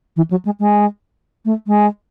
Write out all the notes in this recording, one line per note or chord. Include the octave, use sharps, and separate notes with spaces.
E3
F#3
G#3
G#3
A3
G#3